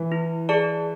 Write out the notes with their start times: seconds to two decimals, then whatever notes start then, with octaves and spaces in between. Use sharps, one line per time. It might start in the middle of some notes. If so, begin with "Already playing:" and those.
Already playing: E3
0.12 E4
0.49 G#4 D5 A5